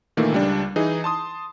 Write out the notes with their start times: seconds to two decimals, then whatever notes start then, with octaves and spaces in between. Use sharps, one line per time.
0.17 A#2 D#3 E3 A3 A#3
0.32 C#2 G3 D4
0.76 E3 D#4 G#4
1.04 A5 C6 D#6